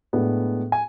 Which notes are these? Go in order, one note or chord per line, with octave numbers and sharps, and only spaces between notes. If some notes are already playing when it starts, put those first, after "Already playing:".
A2 G#3 B3 D4
G#5